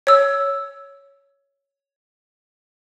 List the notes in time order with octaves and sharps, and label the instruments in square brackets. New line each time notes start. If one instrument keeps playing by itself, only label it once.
[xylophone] C#5 E6